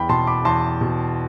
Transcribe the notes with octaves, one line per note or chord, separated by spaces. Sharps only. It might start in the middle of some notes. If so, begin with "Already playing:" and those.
Already playing: E2 G5 B5
B2 A5 C6
B5 D6
E2 A5 C6
B2